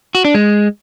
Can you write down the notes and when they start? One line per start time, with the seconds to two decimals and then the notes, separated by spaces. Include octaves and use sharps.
0.15 F#4
0.25 D4
0.35 G#3